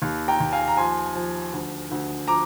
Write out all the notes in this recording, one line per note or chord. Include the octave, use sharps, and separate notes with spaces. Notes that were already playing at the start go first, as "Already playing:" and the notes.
D#2
G5 A#5
D#2
F5 G#5
A#5
F3 G#5 C6
F3
D2
D2
F3 A#5 D6